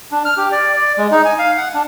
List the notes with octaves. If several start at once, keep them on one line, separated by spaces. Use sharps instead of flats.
D4
F6
G4
D5
D5
G#3
D#4
G#5
F5
F#5
D4